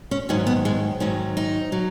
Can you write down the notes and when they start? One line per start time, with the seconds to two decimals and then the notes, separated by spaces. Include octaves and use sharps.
0.11 C#4
0.29 G#2 D#3 F#3 C#4
0.47 B3
0.65 G#3
1.00 G#2 D#3 F#3 C#4
1.37 D#4
1.72 F#3